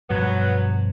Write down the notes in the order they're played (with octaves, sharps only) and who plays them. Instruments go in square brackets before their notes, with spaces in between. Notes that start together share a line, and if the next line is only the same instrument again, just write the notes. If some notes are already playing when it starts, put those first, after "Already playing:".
[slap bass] G2 B2 F3 [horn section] F#3 B3